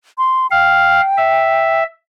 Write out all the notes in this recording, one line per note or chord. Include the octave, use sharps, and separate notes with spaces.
C6
F5 G5
E5